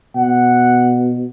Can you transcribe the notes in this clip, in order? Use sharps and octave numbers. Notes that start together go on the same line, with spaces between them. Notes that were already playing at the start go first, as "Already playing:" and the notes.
B2 F#5